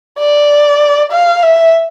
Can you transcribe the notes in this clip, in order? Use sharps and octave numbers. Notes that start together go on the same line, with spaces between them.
D5
F5
E5